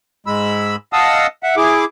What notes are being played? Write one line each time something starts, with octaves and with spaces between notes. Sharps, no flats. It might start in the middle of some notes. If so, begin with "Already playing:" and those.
G#2 G#3 B5 E6
D#5 F5 F#5 A5 D#6 E6
E5 F#5
E4 G#4 D6